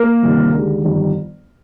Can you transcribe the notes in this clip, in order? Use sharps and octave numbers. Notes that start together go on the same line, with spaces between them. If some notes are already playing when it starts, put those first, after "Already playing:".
Already playing: A#3 A#4
G1 F2 C3 D#3
D#2 D3 G#3
G1 F2 D#3 G3